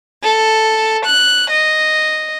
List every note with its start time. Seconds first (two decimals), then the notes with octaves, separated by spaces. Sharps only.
0.23 A4
1.04 F#6
1.51 D#5